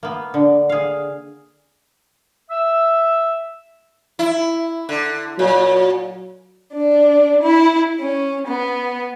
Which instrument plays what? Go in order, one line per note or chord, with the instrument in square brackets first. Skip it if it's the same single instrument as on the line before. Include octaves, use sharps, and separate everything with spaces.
[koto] A#3 B3
D3
G#4 F5
[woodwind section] E5 E6
[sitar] E4
D3
[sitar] A#2 [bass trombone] F#3
[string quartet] D4
E4
C#4
B3